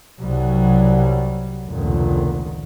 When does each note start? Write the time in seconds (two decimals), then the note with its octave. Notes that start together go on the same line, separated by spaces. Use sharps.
0.18 C2 F#3 G3
1.67 F1 C#2 A#2 D3 D#3